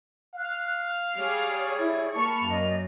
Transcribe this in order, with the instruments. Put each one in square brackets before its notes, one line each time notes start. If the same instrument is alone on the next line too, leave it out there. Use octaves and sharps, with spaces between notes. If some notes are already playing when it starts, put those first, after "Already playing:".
[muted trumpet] F5 [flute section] F#6
[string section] G3 G#4 [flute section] C#5 D5
[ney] E4
[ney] A#3 [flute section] A5 B5 [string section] C#6 F6
[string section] F#2 [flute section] D5 D#5